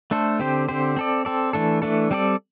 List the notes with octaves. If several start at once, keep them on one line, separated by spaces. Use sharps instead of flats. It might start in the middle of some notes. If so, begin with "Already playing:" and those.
A3 D4 A4 C5
D3 C4 G4 C5
D3 C4 G4 C5
C4 A4 D5
C4 A4 D5
E3 A3 D4 A4
E3 A3 D4 A4
G3 C4 A4 D5